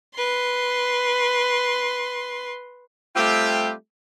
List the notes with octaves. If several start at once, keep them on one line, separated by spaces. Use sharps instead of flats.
B4 C6
G3 A3 C4 F4 G4